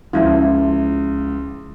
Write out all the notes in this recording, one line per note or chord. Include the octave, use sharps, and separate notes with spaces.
C#2 F3 E4 F4